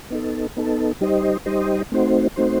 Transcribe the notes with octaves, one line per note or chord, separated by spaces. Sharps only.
B3 D#4 A4
B3 D#4 A4
G3 D#4 G4 C5 D#5
G3 D#4 G4 C5 D#5
A3 C4 D#4 F#4 C5
A3 C4 D#4 F#4 C5